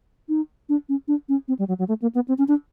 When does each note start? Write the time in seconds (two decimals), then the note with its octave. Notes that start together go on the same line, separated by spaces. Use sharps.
0.29 D#4
0.69 D4
0.89 C#4
1.08 D4
1.29 C#4
1.48 C4
1.59 G3
1.68 F#3
1.79 F#3
1.88 A3
2.02 A#3
2.15 B3
2.28 C4
2.38 C#4
2.48 D4